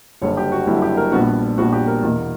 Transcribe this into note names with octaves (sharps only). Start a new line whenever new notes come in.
F#1 F#2 D3 G3 C#5
G4
F#4
F#1 F#2 D3 G3 E4
G4
A#4
A#1 A#2 G3 B3 D4 F#4
A#1 A#2 G3 B3 D4 F#4
G4
A#4
E2 B2 A#3